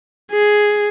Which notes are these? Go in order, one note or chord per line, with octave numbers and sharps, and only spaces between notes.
G#4